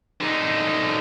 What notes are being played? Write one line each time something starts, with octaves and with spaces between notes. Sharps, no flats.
D3 D#4